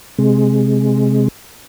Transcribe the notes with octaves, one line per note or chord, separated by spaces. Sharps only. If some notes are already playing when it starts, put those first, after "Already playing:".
C3 G#3